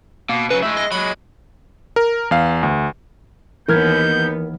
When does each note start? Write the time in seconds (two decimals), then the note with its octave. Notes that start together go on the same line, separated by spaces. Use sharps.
0.29 B2 A#3
0.50 C#3 F#3 B4
0.62 G#3 A3 E4
0.77 D#5
0.92 F#3 G#3 B5
1.96 A#4
2.31 E2 F5
2.63 D2
3.68 D#2 E3 B3 A#4 F6 G6 G#6